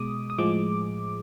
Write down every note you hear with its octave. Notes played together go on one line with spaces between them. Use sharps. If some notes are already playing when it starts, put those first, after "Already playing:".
Already playing: B2 G#3 D6 D#6
D#6
A2 F3 G#3 D6